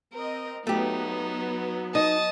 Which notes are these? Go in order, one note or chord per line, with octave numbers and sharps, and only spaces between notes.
C4 A#4 D#5
F#3 A3 B3 D#4 G4
D#4 D#5 A5 D#6